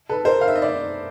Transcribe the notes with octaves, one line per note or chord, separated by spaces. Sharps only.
A4 B4
A#4 C5
F5
E5
D#5
D5 E5